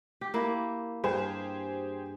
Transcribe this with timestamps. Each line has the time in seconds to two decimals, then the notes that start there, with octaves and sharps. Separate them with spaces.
0.21 G4
0.34 A#3 E4
1.04 G2 G4 G#4 C5